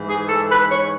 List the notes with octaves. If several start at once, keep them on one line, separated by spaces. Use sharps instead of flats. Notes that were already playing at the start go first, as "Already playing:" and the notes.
Already playing: G#2 E3
G#4
A4
B4
C#5